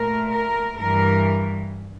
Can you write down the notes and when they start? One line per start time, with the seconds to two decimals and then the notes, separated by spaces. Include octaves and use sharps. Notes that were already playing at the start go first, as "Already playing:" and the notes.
Already playing: A#2 A3 A#4
0.30 A#4
0.77 G2 E3 G3 A#4